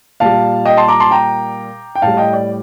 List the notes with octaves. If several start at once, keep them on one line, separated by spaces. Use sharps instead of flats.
A#2 G3 F5 A5
D#5 G5
A5 C6
A#5 D6
A5 C6
G5 A#5
G5
A2 G3 F5 A5
D#5 G5
D5